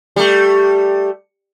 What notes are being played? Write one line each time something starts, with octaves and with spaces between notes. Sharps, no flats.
G3 A3